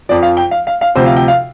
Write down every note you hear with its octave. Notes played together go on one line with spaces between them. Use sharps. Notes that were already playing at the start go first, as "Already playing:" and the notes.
F2 F3 D5
F5
G5
F5
F5
F5
D2 C3 F3 C5
F5
G5
F5